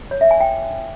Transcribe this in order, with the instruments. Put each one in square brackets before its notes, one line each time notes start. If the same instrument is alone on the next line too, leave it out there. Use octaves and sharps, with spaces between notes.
[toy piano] C#5
E5
G#5
G5